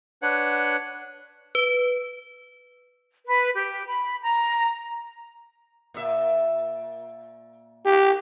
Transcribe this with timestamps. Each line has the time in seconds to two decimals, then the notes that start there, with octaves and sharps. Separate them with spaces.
0.22 D4 B4 C#5 F#5
1.55 B4
3.25 B4
3.54 G4
3.87 B5
4.22 A#5
5.94 A#2 E5
7.86 G4